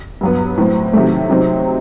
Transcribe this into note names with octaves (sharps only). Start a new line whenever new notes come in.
G2 F#3 B3
A2 F#3 C4
C3 D#3 F#3 A3
C3 F#3 C4 D#4